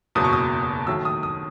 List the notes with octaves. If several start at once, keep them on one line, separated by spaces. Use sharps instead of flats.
F#1 E2 B2 F#3 D#6
C#6
D#6
D#2 D#3 F#3 A3 E6
D#6
D#6